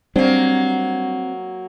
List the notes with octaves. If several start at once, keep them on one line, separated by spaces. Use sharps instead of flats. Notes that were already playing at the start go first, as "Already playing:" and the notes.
F#3 G3 A#3 C4 D4